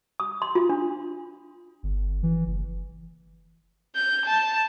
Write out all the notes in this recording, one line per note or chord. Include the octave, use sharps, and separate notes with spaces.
D#6
C6
F4
D4
G1
E3
F#1
G6
A5